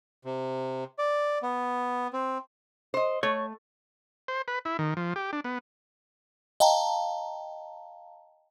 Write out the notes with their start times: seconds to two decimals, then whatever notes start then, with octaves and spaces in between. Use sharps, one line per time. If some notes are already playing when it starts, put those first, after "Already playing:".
0.25 C3
0.99 D5
1.43 B3
2.13 C4
2.94 C5 D#5
3.23 A3 C#5
4.28 C5
4.48 B4
4.65 E4
4.79 D#3
4.97 F3
5.16 G4
5.33 D4
5.44 B3
6.60 D#5 F5 G5 A5 A#5